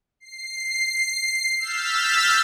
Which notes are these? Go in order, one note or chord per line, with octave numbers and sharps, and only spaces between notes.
C7
E6 F6 G6 A6 B6